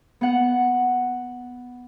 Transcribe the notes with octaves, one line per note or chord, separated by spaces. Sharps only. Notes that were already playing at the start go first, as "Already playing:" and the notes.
B3 F#5